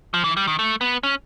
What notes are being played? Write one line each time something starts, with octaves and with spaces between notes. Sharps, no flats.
F3
E3
G3
D#3
A3
B3
C#4